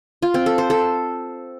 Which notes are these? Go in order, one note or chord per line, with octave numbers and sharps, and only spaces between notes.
F4
C4
A4
C5
A4